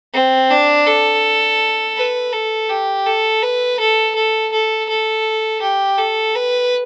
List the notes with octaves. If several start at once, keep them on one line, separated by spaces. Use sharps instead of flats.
C4
D4
A4
B4
A4
G4
A4
B4
A4
A4
A4
A4
G4
A4
B4